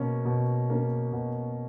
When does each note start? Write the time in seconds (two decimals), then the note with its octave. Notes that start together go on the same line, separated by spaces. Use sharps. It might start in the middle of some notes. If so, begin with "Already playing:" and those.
Already playing: B2 A#3 C#4
0.25 B2
0.70 A#3 C#4
1.12 B2